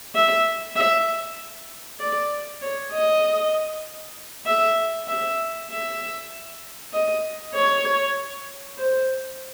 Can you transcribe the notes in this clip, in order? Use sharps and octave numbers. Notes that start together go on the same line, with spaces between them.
E5
E5
D5
C#5
D#5
E5
E5
E5
D#5
C#5
C5